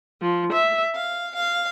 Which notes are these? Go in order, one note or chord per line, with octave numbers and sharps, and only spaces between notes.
F3
E5
F5
F5